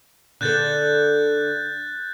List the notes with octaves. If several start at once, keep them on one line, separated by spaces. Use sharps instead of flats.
D3 A4 F#6 G6 A6